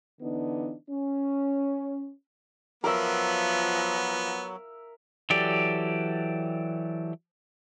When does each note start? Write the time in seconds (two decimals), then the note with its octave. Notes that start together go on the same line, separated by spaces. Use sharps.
0.21 D3 E3 B3 D4 D#4
0.90 C#4
2.84 F3 F#3 B3 A#4 E5
5.30 E3 F#3 G4 A4 D5